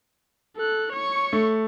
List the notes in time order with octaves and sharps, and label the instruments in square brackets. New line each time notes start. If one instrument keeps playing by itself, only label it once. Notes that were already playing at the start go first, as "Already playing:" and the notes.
[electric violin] A4 F#6
C#5 C#6
[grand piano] A3